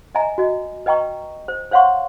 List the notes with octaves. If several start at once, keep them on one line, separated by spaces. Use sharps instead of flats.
D#5 E5 G#5 A#5
F#4 D#5
B4 D#5 G5 A#5 C#6
C5
C5 C#5 F5 F#5 C6 C#6